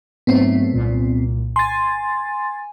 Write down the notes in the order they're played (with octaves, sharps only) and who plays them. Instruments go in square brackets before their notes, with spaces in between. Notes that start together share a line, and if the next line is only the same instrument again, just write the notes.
[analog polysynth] G#2 F#3 A3 [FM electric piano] B3 C4
[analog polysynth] C2 A#2
[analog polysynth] G#5 [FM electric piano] C6 A6